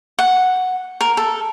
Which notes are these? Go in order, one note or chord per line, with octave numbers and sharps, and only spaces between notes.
F#5
A#4
A4